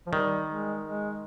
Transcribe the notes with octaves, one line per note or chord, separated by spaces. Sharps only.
F3
D#3 G3
G#3
G#3